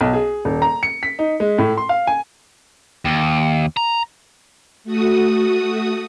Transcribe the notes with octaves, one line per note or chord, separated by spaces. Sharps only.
B1
G#4
D#1
A#5
C#7
B6
D#4
G#3
A2
C6
F5
G#5
D#2
A#5
A3 F#4 D#6